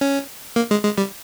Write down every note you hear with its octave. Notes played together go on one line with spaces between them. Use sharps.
C#4
A#3
G#3
G#3
G3